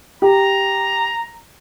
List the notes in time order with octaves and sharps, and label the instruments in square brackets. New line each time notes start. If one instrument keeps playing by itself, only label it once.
[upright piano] G4 [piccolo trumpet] A#5